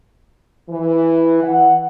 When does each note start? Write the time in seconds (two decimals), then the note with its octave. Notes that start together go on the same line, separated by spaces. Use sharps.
0.69 E3
1.43 F#5